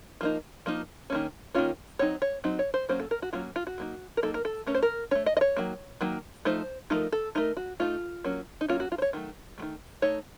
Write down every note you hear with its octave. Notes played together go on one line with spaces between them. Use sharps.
F3 A#3 D#4
F3 A#3 D#4
D#3 A#3 C#4
D#3 A#3 C#4 F4
F#3 C4 D#4 C#5
C#5
F#3 C4 D#4
C#5
C5
F#3 A#3 C#4 C5
A4
A#4
F#4
F#3 A#3 C#4 F4
F4
F#4
F#3 A#3 D#4
A#4
F#3 A#3 D#4 A4
A#4
A4
A3 C#4 A#4
C5
A#4
A3 C#4 C#5
D#5
D#5
C#5
D#3 F#3 A#3
D#3 F#3 A#3
F3 A3 D#4 C5
F3 A3 D#4 A#4
A4
A3 D#4 A#4
F#4
A3 D#4 F4
F#3 A#3 C#4
D#4
F#3 A#3 C#4 F4
F#4
F4
C5
C#5
D#3 F#3 A3
D#3 F#3 A3
A3 D#4 C#5